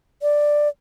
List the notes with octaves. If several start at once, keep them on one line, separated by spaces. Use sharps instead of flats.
D5